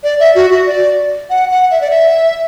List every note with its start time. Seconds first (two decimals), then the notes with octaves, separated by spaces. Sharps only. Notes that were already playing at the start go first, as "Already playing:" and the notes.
0.03 D5
0.20 E5
0.35 F#4
0.51 F#4
0.66 D5
1.30 F#5
1.51 F#5
1.71 E5
1.81 D5
1.90 E5